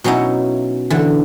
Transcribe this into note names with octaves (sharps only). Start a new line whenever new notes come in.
B2 F#3 C#4 D#4 E4
D3 E3